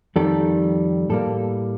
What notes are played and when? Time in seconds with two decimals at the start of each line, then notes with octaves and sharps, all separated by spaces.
0.16 F2 D#3 G3 A4
1.09 A2 G3 A#3 A4